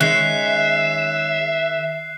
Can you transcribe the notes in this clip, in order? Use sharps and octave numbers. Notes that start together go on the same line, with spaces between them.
D#3 G#3 C#4 E5 F#6 C7